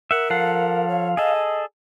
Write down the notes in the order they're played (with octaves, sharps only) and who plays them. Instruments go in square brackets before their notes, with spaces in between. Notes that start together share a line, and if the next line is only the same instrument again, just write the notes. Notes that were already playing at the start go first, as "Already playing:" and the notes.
[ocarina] A#4 [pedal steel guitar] E5 F#5
[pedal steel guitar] F3 A4 F#5 [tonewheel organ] F5
[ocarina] C#5
[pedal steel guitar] G#4 A4 [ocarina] D#5